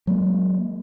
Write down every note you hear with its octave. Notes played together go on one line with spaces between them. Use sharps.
F#3 G#3 A#3